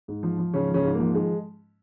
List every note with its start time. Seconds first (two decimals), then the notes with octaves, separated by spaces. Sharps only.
0.08 G#2
0.23 F3
0.38 F3
0.54 G#2 C#3 C#4
0.69 F3
0.74 C#3 C#4
0.84 G#2
0.94 A#3
1.00 F3
1.15 D#3 G#3